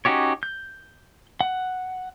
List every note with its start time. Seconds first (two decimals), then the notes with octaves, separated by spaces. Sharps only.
0.05 C#4 D#4 F#4 G4 C#5
0.43 G6
1.41 F#5